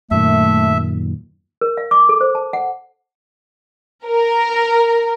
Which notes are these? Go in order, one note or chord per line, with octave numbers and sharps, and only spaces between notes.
F#2 A#2 D#3 A3 E5
A#4
F5
D6
A4
C5
A5
F#5
A#4